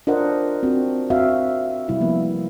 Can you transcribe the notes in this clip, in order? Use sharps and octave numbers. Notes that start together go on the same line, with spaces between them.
D4 F4 A#4 C5 D#5 F#5
C4 F#4
C4 F#4 E5 F5
C3 G3 E4
F3 A#3 B3